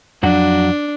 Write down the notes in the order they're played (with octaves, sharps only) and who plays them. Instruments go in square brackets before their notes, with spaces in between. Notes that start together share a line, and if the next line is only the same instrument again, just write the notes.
[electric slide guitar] F2 F#3 F#4 [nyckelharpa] D4